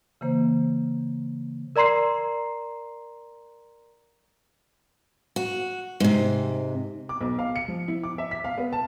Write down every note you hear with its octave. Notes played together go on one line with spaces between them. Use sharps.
C#3 E3 A#3 C5
A#4 D5 A#5 C6 C7
F#4
G#2 C3
D6
B1
F5
C#7
F3
E4
D6
E5
B6
F5
B3
A5